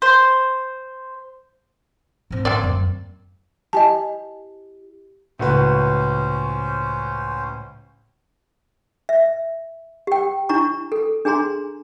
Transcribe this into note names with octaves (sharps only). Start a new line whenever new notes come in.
C5
G#2 C4
D3 A#3 C4 D5
F#2
E4 G4 D#5 G#5 A5
C#2 A2 C#4 F#4 B4 C5
E5
G4 G5
D4 E4 A#5 C#6
A4
D4 G#4 G#5 A#5 C6